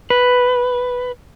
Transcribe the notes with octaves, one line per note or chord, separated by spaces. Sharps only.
B4